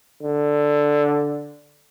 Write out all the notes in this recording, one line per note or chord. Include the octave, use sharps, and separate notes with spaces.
D3